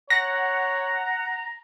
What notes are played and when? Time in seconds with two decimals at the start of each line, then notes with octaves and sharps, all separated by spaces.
0.10 C#5 F#5 A#5 A#6